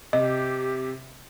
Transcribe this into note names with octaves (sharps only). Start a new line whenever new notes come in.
C3 G4 D#5